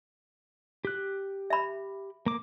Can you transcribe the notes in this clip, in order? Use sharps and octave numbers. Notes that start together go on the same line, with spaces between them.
G4 F#6
E5 B5
A#3 D6